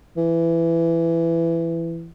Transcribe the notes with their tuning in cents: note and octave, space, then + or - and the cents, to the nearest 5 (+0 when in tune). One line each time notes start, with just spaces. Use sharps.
E3 +15